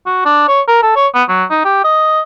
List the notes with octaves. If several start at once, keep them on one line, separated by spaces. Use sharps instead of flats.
F#4
D4
C#5
A#4
A4
C#5
B3
F#3
D#4
G4
D#5